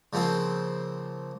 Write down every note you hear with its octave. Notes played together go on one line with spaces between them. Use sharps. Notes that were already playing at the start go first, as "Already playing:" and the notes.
C#3 F3 A#3 C4